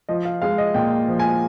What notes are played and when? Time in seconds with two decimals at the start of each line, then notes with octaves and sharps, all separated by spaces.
0.09 F3 D#5
0.25 F5
0.42 G#3 F5
0.58 D#5
0.74 A#2 G5
1.08 F3
1.19 G#5